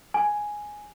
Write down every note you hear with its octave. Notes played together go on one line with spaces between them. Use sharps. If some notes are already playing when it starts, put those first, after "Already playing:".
G#5